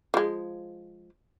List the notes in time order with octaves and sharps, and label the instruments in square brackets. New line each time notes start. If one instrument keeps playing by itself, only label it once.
[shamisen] F3 G#3